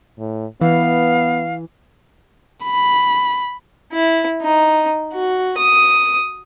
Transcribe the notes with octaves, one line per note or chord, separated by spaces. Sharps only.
A2
E3 B3 F5
B5
E4
D#4
F#4
D#6